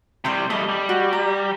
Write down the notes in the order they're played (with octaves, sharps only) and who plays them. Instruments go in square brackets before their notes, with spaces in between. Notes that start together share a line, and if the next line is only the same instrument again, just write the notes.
[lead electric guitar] C3 G3 [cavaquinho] G5 C6
[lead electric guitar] G3 A3 [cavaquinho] D#5
[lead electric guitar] G3
[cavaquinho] F#4
A#5